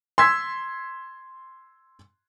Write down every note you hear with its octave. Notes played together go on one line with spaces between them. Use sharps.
C6 E6 G#6 B6